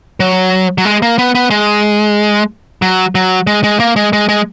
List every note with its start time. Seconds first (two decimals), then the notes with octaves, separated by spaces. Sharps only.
0.20 F#3
0.78 F#3
0.85 G#3
1.02 A#3
1.19 B3
1.35 B3
1.50 G#3
2.82 F#3
3.15 F#3
3.47 G#3
3.64 G#3
3.80 A#3
3.96 G#3
4.13 G#3
4.29 G#3